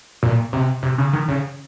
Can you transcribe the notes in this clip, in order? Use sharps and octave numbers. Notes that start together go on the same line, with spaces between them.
A#2
C3
C3
C#3
D#3
C#3